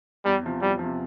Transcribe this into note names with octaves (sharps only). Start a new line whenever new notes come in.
E2 G3
C3 F3
E2 G3
C3 F3